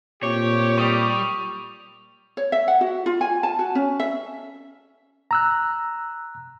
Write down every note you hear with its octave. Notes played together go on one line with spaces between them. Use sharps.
A#2 A3 C4 G4 C#5
G3 C#6 D#6 F7
C#5
E5
F#5
F#4
F4
G#5
A5
F#4
C#4
E5
A#5 E6 F#6